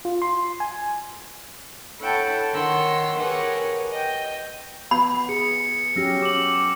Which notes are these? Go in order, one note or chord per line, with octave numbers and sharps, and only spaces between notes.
F4
C6
G#5
E4 A4 C#5 F#5 G5 A5
D#3 A#4 C#5 F#5 C6 E6
G4 G#4 A#4 B4 C#5 F#5
D#5 G5
B3 B5 C7
G#4 C#7
F#3 C#4 G4 E6 F6 A#6
D6 F#7